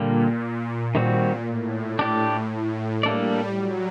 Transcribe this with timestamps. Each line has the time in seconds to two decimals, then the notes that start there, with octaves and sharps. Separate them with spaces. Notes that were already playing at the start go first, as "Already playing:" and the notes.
Already playing: A#2 D3 G3 A#3
0.94 A#2 D#3 G3 C4 F#4
1.47 A2
1.99 A2 D4 G4 D5
2.51 A2
3.03 G3 A#3 D4 A4 D5
3.56 F#3